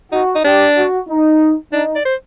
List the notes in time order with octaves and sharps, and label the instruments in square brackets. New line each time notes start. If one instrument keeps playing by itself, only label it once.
[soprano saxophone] D#4 [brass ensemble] F#4
[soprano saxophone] D#4
[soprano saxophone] D4 [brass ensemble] G4
[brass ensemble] F#4
D#4
[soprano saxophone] D4 [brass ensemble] D#4
[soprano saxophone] D5
C5